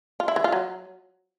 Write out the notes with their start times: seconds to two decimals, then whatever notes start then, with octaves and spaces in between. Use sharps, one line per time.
0.20 F4
0.28 E4
0.36 E3
0.44 F4
0.52 F#3